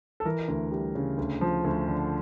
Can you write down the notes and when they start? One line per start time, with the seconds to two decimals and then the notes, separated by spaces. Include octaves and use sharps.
0.20 A4
0.25 E3 A#4
0.48 D2
0.72 G3
0.95 C#3
1.18 D2
1.41 F3
1.65 D2
1.88 D3